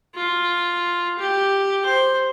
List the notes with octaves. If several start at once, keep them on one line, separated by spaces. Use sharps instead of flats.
F4
G4
C5